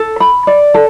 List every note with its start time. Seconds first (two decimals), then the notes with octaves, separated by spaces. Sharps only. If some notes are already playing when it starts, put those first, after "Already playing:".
Already playing: A4
0.20 B5
0.47 D5
0.74 A4